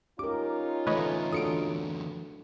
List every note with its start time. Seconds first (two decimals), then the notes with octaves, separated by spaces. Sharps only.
0.19 C#4 D#4 F4 G4 A#4 D6
0.87 D2 E3 A3 B4 C#5 D#5
1.32 D4 F#4 A4 D#6 C#7 D7